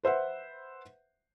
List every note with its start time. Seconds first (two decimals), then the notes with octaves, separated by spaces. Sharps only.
0.03 B4 C5 E5 F#5